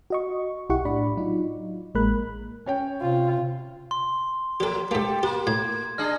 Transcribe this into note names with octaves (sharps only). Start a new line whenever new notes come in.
F#4 D#5 C#6
B1 E4 G4 F#5 C#6
A2 D4 D5 B5
F#3 D#4 F4
A1 G#3 A#3 A#4 B5 F#6
C#4 C#5 G5
C3 F4
C6
F3 A#3 G4 A4
G#2 A#3 G4 A4
A#3 G4
A2 G#6
D4 G#4 D#5 F6